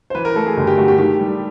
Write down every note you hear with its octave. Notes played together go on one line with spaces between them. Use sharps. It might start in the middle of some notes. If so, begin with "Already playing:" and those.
C5
E3 B4
A#4
A3 A4
G#4
G1 G4
G4
A3 F#4
G4
D#3 G4
G3